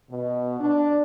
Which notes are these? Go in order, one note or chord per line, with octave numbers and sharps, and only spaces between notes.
B2
D4